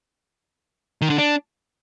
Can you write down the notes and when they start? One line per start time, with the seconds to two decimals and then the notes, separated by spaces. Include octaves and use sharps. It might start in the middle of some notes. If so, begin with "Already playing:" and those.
1.02 D#3
1.10 D3
1.18 D4